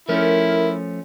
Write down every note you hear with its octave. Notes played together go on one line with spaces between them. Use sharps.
F3 A3 C#4 E4 A#4